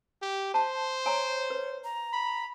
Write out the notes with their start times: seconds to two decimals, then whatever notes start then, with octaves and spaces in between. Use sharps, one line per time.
0.22 G4
0.54 C5 A5
1.06 C#5 G#5 A#5 C6
1.50 B4
1.84 A#5
2.13 B5